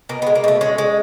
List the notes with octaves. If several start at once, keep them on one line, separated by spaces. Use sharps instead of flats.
B2 A#3
B3
G#3
A#3
B2 A3
G#3 C#4
G#3